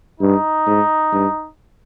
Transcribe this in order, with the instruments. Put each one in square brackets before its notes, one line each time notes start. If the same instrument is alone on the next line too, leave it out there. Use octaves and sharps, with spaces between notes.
[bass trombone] G2 [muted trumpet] D#4
[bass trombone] G#2
G2